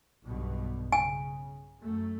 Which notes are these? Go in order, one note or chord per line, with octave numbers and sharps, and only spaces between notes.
B1 G2 B2
C#3 G#5
F#2 A3